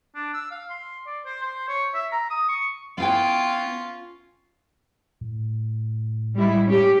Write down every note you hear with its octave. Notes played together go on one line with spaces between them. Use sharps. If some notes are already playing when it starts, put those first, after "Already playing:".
D4
E6
F5
C6
D5
C5
C5
C#5
E5
A#5
D#6
C#6
B3 C#4 E4 F4 G5
A2
G3 G#3 E4
C#4 G4